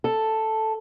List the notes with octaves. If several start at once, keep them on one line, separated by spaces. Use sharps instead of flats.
A4